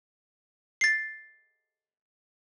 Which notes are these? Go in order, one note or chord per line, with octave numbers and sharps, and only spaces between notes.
A6 C7